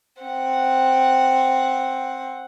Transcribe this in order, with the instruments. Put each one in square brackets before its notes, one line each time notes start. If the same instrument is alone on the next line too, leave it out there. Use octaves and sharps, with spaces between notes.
[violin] C4 F#5